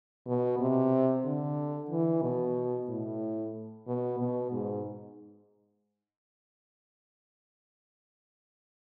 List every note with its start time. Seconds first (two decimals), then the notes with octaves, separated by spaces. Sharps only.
0.26 B2
0.59 C3
1.25 D3
1.90 E3
2.22 B2
2.89 A2
3.87 B2
4.19 B2
4.52 G#2